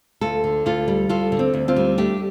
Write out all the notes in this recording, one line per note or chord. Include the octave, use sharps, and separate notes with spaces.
D2 F4 A4
D3
D2 F4 A4
G3
D2 F4 A4
D3
C4
D2
C4 F4
G3
A3 D4 G4